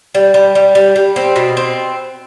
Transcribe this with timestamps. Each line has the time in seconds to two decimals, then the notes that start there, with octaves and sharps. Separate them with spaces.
0.15 G3
0.34 G3
0.55 G3
0.75 G3
0.96 G3
1.16 C4
1.36 B2
1.57 C4